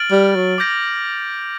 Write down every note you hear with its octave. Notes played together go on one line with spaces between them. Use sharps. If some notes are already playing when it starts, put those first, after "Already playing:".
Already playing: F6 A6 D7 F#7
G3
F#3
D6 G6 A#6 D7